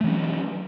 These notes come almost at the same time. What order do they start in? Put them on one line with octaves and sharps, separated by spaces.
A3 E3 C#4 F#3